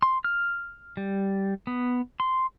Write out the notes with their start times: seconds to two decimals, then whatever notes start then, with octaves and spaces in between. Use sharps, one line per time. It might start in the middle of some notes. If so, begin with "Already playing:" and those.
0.02 C6
0.24 F6
0.97 G3
1.67 B3
2.20 C6